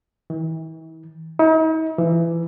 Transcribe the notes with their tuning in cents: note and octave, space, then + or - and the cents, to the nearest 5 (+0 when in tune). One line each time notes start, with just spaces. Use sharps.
E3 -40
D#4 +45
E3 +25